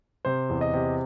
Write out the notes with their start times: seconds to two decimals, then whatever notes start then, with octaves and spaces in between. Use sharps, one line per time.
0.25 C3 C5
0.49 E2
0.61 D#5
0.74 C3